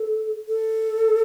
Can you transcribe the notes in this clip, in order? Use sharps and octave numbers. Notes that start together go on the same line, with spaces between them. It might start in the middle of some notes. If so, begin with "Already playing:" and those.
Already playing: A4
A4